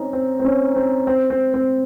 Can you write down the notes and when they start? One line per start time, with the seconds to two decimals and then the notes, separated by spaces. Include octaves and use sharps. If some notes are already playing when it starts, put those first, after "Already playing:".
Already playing: C4 C#4 D#4
0.13 C4
0.39 C4
0.45 C#4
0.76 C4
1.07 C4
1.30 C4
1.54 C4